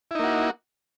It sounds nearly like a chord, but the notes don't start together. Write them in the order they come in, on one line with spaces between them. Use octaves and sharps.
E4 D#4 A#3 F#4